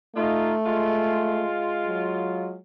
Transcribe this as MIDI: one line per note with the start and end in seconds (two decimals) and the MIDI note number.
0.16 1.44 57
0.16 0.54 63
0.16 0.54 65
0.66 2.56 56
0.66 2.56 65
1.87 2.59 54